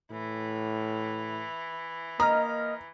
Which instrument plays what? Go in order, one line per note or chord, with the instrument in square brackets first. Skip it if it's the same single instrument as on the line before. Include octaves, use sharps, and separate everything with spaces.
[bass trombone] A2 [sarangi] E3
[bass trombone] A#3 [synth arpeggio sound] D#5 F6 [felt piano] A#5